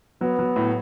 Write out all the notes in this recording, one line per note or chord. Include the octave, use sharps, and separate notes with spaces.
F#3 B3
F#3
A2